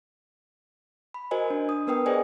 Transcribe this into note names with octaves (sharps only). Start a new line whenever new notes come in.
B5
F#4 A#4 C5 D#5 G#5
D4
D#6
B3 A#4 B4 G5 D#6
G#4 C5 D5 D#5 G5 G#5